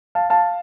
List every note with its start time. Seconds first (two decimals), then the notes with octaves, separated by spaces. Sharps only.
0.15 F5 A5
0.30 F5 A5